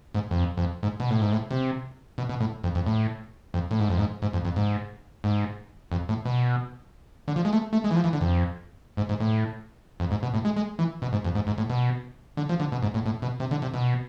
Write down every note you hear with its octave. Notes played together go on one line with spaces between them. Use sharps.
G#2
F2
F2
G#2
B2
A2
G#2
A2
C3
B2
B2
A2
F2
F2
A2
F2
A2
G#2
F2
G#2
G#2
F2
F2
G#2
G#2
F2
A2
B2
D3
F3
G#3
A3
A3
G#3
E3
F3
E3
D3
F2
G#2
G#2
A2
F2
G#2
B2
A2
G#3
G#3
E3
B2
G#2
F2
G#2
G#2
A2
B2
D3
F3
D3
B2
G#2
A2
A2
B2
C3
D3
C3
B2